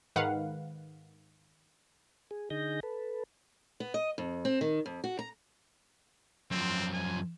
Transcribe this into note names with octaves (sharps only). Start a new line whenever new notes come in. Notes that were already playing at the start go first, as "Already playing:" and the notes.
G#2 D#3 B4 F5 F#5
G#4
D3 D#4 G#4 D#5 G6 A#6
A4 B4
B3
D#5
F2
C4
D#3
F2
F#4
A#5
F#2 F3 C4
G#5